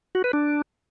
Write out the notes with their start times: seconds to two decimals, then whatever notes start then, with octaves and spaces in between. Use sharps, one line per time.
0.15 F#4
0.24 B4
0.33 D4